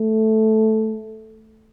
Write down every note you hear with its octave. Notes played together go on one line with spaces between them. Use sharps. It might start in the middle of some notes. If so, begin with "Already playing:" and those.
Already playing: A3